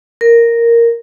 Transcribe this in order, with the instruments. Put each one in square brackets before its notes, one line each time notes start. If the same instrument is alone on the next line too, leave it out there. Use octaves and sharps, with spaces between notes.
[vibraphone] A#4